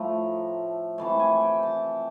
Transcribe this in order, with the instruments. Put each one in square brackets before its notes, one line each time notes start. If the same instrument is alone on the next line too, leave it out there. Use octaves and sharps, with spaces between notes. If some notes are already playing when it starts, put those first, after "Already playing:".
Already playing: [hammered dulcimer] A2 F3 A3 A#5
C3 E3 A3 A5
G#5
G5
A5